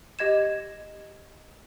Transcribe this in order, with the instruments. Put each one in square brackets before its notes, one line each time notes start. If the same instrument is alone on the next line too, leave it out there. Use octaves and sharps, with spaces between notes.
[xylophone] G4 D#5 G#6 E7